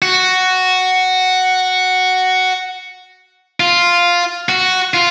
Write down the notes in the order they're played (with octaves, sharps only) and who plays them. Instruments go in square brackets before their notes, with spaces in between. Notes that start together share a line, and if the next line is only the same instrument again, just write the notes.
[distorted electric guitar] F#4
F4
F#4
F4